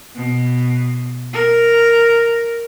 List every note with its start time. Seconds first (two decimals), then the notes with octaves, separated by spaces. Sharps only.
0.16 B2
1.33 A#4